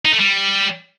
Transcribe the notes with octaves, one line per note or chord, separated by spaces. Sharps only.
D#4
A3
G3